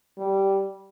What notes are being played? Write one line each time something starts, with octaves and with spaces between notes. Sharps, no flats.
G3